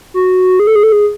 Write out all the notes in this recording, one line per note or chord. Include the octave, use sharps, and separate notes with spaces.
F#4
G#4
A4
G#4
A4
G#4